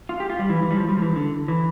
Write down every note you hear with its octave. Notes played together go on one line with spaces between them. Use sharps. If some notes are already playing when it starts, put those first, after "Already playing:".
F4
G4
F4
G3
E3
E3
G3
F3
G3
F3
E3
D3
E3